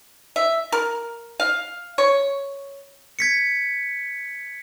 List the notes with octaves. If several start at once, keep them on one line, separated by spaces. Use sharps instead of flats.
E5
A#4
F5
C#5
G#6 B6 C#7